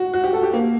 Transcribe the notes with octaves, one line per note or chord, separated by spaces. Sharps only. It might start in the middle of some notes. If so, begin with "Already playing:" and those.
Already playing: F#4
F#4
G4
A4
G4
A#3